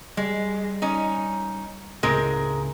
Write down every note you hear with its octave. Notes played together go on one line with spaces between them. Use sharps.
G3 G#3
C#4 D#4
C#2 A2 C#3 G#3 C4 A#4